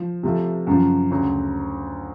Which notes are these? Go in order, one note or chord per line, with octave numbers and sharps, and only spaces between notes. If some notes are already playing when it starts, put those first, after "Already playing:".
Already playing: F3
C3 F3 A3
F#2 C#3 F3
D2 C#3 F#3